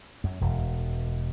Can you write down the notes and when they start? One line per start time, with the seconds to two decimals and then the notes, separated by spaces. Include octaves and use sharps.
0.24 F#2
0.41 E1